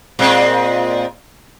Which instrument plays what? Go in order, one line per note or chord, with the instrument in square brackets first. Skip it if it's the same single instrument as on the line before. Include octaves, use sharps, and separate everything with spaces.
[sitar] A#2 G#3 C4